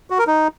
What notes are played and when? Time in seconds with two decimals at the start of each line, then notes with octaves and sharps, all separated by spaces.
0.10 F#4
0.19 A#4
0.27 D#4